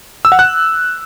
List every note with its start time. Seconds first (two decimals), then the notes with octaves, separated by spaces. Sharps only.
0.25 E6
0.32 F#5
0.39 F#6